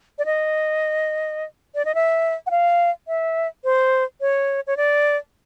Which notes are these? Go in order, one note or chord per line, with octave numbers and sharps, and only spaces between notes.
D5
D#5
D5
D#5
E5
F#5
F5
E5
C5
C#5
C#5
D5